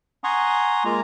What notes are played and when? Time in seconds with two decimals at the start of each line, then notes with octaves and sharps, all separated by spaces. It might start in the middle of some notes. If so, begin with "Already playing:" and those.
0.24 F#5 G#5 A#5 C6 C#6 D#6
0.85 G#3 A#3 F4 A#5